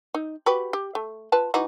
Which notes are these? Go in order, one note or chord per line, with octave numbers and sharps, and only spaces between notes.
D#4
F#4 G4 B4
G4
A3
F4 B4 A5
E3 D#4 F#4